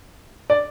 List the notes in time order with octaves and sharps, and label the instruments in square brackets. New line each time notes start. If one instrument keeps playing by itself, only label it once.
[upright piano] D5